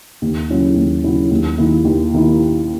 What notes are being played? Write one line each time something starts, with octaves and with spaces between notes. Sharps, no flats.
D#2
C#3 F#3 C#4 E4
D#2
C#3 F#3 C#4 E4
D#2
D#3 A#3 E4
D#2
D#3 A#3 E4